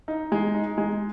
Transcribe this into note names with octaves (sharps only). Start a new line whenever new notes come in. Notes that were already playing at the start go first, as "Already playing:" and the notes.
D#4
G#3
D#4
G#3